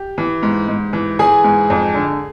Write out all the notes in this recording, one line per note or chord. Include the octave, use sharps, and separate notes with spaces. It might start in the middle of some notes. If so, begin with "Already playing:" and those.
Already playing: G4
E3
G#2
G#2
E3
E3 G#4 G#5
G#2
F2
D3